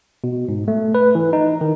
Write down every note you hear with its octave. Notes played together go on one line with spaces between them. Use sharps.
B2
G#2
A3
B4
E3
D#4
D#3